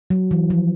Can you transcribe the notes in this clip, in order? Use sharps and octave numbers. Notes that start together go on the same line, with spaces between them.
F#3
E3
F3